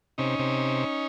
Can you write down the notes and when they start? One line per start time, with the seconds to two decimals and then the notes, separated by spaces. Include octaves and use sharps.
0.18 C3 C#4 D#4
0.39 C3